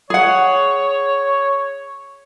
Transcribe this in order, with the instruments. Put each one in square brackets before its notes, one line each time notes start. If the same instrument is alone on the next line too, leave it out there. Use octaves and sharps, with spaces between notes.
[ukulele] G#4 F#5 [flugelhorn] C#5